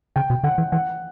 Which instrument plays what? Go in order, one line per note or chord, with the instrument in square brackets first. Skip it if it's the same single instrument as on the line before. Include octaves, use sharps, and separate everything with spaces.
[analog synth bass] C#3 [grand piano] G5
[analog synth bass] B2
[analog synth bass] D3 [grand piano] F#5
[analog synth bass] E3
[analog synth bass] E3 [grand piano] F#5